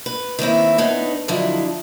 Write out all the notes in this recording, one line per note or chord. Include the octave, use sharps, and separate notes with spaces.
B4
D#3 A#3 C4 E4
B3 D4 D#4 B4 C#5
F2 D3 F3 F#3 E4 D#5